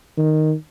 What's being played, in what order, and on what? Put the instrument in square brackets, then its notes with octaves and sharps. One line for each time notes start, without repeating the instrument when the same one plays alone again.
[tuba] D#3